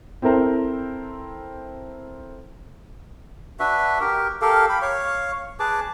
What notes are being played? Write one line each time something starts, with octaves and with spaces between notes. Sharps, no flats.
C4 E4 A4 A#4 C5
D4 F#4 B4 E5
G4 A#4
G4 A4 A#4 F5
G5 B5
C#5 F5 C#6
G#4 B4 A5 D6